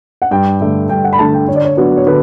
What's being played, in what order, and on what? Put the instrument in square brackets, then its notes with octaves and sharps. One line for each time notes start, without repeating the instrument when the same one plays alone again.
[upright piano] F#5
[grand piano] G2 [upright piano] G5
[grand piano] D3 A3
[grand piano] G2 [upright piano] G5
[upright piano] F#5
B5
[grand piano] D3 A3 [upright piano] A5
[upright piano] G5
[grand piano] D3 [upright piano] C#5
[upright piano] D5
C#5
[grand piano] F#3 B3 D4 F#4
[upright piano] C#5
[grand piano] D3 [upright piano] B4